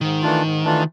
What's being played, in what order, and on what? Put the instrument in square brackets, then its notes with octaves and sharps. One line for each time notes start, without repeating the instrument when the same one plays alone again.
[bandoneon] G#2 [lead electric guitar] D#3
[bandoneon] E3 A3 D4 F4
G#2
E3 A3 D4 F4